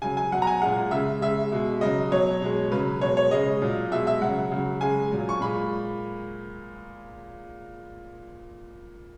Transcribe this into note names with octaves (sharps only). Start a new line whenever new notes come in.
C#3 F#3 G#5
G#5
B2 F#3 F#5
A#5
G#5
A#2 G#3 F#5
C#3 G#3 E5
C#3 G#3 E5
B2 G#3
C#3 F#3 D#5
B2 F#3 C#5
B2 G#3
C#3 F#3 B4
B2 G#3 C#5
C#5
C#3 G#3 D#5
A#2 F#3
B2 G#3 E5
E5
C#3 F#3 F#5
C#3 F#3
C#3 G#3 G#5
A#2 F#3
C#6
A#2 G#3 B5